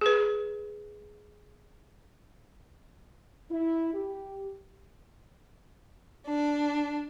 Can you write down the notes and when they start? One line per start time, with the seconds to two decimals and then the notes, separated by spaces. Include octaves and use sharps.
0.01 G#4 B4
3.50 E4
3.94 G4
6.27 D4